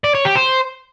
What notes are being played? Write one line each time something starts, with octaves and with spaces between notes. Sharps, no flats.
D5
C#5
G4
C5